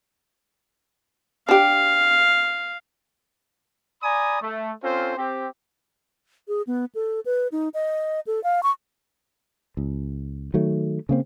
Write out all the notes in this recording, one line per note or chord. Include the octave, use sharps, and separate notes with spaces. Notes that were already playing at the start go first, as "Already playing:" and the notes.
D4 G4 F5
D5 G#5 A#5 B5 D#6
A3
C4 C#4 F4 A4 C5
C4 G4
G#4
B3
A4
B4
D#4
D#5
A4
F5
C#6
C#2
D#3 F#3 A3
C#3 A#3 C4